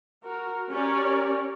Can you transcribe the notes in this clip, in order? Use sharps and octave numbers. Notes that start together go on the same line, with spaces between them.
F#4 A#4
C#4 G4 A#4 C#5 D5